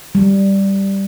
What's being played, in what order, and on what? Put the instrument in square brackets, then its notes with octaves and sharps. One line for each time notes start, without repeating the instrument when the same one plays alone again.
[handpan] G3